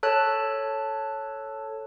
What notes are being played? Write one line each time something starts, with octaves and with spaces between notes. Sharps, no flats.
A4 C#5 A5 F#6